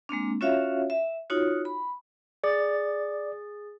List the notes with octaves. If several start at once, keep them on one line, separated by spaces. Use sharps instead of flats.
G#3 A#3 C4 D4
C#4 F4 F#4 C#5 E5 F5
E5
D#4 F4 F#4 C#5
B5
G#4 D5 A6